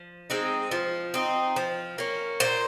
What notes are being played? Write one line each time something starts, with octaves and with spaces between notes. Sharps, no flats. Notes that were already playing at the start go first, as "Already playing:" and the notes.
Already playing: F3
G#3 C4 D#4
F3
C4 D#4
F3
A#3 C#4
A#2 C5